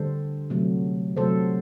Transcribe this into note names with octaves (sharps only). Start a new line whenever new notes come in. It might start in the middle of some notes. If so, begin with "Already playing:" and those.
Already playing: D3 G3 A4 C5
C3 F#3 A3
C3 F#3 A3 A4 C5